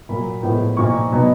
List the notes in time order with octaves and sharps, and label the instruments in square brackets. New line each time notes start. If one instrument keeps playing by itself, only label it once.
[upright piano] A#2 F#3 A#3 B5
A2 F3 G#3 B3
A#2 F3 A#3 D#4 C#6
B2 F#3 B3 D#4